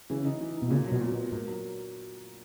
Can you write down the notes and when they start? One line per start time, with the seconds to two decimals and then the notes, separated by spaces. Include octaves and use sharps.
0.10 C#3 E3
0.25 D#4
0.41 E3
0.56 D#4
0.62 B2
0.70 A#2 C#3
0.86 F#3
0.92 B2
1.01 A#2
1.12 B2
1.17 B3
1.32 G#2 A#3
1.47 F#3